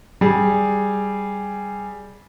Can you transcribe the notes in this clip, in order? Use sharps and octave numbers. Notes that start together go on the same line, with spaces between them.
G3 G#4